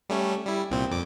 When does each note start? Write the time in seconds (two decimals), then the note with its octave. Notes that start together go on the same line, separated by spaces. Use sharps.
0.09 G3 A3 C#4
0.46 G3 E4
0.70 C2 A#2 C4
0.91 F2 D6